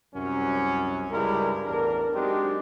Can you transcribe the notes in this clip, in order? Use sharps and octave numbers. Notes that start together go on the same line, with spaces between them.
C2 F#2 C#4
C#2 G2 G3 G#3 E4 A#4
A1 E2 D4 A#4
F#3 G#3 C4 D4 D#4 G4